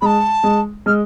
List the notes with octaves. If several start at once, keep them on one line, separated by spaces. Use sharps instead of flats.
G#3 A5 B5
G#3
G#3 F6